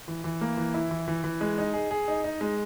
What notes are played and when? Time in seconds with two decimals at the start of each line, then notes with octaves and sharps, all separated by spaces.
0.08 E3
0.24 E3
0.41 A#3
0.57 E3
0.74 E4
0.91 E3
1.08 E3
1.24 E3
1.41 G#3
1.58 D#4
1.74 G#4
1.91 G#4
2.08 D#4
2.24 D#4
2.41 G#3